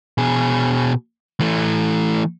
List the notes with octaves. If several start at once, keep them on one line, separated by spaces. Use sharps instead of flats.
B2 G#4
E3 A3